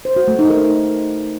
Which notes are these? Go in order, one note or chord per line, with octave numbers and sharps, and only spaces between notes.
C5
F#4
A3
D#4
A#4